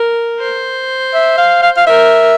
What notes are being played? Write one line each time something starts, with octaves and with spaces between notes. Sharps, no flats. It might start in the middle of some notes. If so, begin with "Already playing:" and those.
Already playing: A#4
C5
E5
F5
F5
F5
A#4 E5